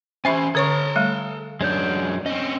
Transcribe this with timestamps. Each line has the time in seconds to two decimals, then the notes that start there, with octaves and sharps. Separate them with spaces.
0.25 C#4 G4 C5 E5 G#5 B5 C6
0.55 D3 A4 C#5 A#5 C#6 D#6
0.96 G3 A3
1.61 F#2 G#3 D4 C#5 G6
2.26 C4 C#4 D#5